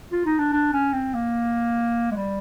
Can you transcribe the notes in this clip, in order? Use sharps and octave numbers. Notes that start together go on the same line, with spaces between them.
F4
D#4
D4
D4
C#4
C4
A#3
G#3
G3